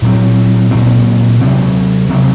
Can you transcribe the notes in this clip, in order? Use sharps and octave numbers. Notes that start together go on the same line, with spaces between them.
A#2 F#3 C4
A#2 F#3 C4
C3 F#3 C4
C3 F#3 C4